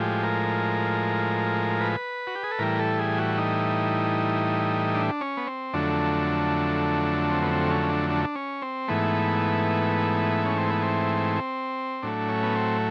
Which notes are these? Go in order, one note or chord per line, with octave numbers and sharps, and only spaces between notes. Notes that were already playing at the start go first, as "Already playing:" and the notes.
Already playing: A2 F3 G#3 G4
A#4
B4
F#4
G4
G#4
A4
A2 E3 G3 A#4
A4
G#4
F#4
D#4
D4
C#4
B3
C4
F2 D3 F#3 A3 D4
C4
B3
C4
C#4
C#4
D4
D4
D4
C#4
C4
G#2 E3 A3 B3
C#4
C4
B3
C4
A2 F#3 A3 D4
C#4
B3
C4